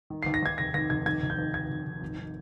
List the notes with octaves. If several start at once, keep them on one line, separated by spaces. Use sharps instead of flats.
D#3
C7
D#2
A#6
D#2 G#6
F1 A#6
D#2 A#6
F1 G#6
D#2 G#6
F1
G6
D#2
F1 G#6
F1
F1
G#1
D#3